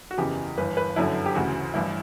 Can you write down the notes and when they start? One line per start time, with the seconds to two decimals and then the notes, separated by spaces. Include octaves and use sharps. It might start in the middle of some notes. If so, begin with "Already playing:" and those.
0.11 F#4
0.18 F#1 E2 C#3 E3 G4
0.57 G1 G2 E3 B4
0.77 B4
0.96 G1 F#2 D3 E4
1.26 G4
1.35 D2 C#3 E3 F#4
1.74 A1 G2 E3 E4